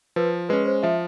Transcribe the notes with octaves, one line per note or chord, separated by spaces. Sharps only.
F3 B4
G#3 C#4 B4
C5
F3 E5